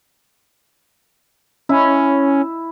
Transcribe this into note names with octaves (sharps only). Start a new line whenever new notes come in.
C#4 E4